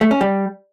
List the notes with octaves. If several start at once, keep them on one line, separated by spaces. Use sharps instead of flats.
A3
C#4
G3